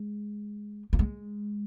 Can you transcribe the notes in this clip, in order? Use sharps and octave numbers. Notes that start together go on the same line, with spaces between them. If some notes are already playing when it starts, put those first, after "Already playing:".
Already playing: G#3
A#3
G#3